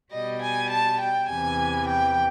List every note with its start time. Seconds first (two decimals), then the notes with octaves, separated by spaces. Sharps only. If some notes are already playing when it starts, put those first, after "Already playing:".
0.12 B2 G3 D#5
0.42 G#5
0.70 A5
1.01 G5
1.29 E2 C3 E3 G#5
1.88 G5